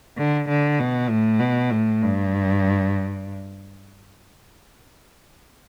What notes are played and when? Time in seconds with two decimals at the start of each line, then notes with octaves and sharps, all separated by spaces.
0.18 D3
0.48 D3
0.79 B2
1.09 A2
1.40 B2
1.70 A2
2.02 G2